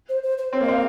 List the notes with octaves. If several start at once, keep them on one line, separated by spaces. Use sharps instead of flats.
C5
C5
C5
C4 C#5
A#3 D#5
C4 F5